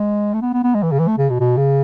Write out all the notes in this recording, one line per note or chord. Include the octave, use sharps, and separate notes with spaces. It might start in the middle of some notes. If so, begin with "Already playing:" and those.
Already playing: G#3
A3
B3
B3
B3
G#3
E3
C#3
E3
A3
C#3
B2
B2
C#3